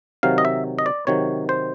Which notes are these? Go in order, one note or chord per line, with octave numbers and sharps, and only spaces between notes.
C3 D#3 F#3 F5
D#5
E5
D#5
D5
C3 D#3 F#3 C#5
C5